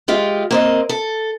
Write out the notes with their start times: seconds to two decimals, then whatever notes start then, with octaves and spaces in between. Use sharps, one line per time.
0.08 G#3 F4 G4
0.51 A#3 C4 D#5
0.89 A4